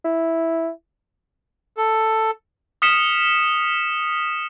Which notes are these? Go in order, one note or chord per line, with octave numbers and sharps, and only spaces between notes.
E4
A4
D#6 F6 B6 C#7 E7